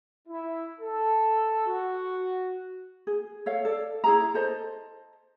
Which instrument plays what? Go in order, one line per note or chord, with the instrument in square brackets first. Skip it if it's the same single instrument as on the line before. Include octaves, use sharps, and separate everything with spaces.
[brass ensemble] E4
A4
F#4
[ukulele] G#4
A4 C#5 F5
A4 D5
E4 G#4 A#5
A4 C5 D#5